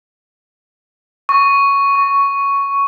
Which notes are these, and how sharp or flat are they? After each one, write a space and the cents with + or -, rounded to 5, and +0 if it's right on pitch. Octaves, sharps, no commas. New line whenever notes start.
C#6 +5
C#6 +10